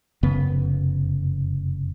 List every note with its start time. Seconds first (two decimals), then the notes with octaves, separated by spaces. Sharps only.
0.23 F1 F#2 C#3 B3